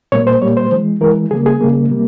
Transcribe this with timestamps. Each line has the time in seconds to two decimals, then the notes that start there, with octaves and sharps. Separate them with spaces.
0.12 A#2 G3 A#3 C#5
0.27 C5
0.42 A#2 G3 A#3 C#5
0.57 C5
0.72 E3 G#3
1.01 E3 G#3 A#4
1.31 C#3 G3 A#3 G#4
1.46 G#4
1.61 C#3 G3 A#3
1.90 C3 G3 A#3